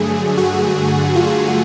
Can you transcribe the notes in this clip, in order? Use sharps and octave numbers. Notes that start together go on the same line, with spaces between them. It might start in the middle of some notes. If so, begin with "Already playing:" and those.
Already playing: G2 D3 F#3 A3 G#4
F#4
F4